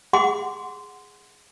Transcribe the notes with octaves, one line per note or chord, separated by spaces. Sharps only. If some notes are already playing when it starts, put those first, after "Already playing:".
G#4 F#5 C6 D6